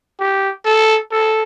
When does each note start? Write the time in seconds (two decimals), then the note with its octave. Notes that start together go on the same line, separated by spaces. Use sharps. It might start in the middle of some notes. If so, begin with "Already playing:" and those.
0.19 G4
0.65 A4
1.12 A4